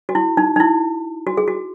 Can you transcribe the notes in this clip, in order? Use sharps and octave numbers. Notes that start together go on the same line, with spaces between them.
F#4
E4
D#4
D#4
E4
F#4
G#4
F#4